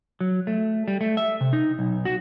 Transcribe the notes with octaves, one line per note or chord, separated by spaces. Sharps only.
F#3
A3
G3
A3
E5
C3
D#4
B1
F#4